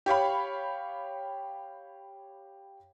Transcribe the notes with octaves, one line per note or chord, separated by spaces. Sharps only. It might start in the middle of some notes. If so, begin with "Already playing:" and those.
G4 C#5 F5 B5